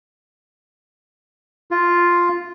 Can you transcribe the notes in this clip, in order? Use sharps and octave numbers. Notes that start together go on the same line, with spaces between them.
F4